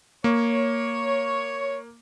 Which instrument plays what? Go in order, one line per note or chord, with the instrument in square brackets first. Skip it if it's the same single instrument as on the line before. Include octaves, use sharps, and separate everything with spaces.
[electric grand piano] A#3 [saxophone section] C#5